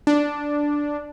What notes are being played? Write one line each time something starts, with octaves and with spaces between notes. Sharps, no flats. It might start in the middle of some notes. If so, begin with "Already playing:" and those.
D4